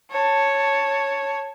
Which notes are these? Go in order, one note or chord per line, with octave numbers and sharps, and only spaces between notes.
C#5 A5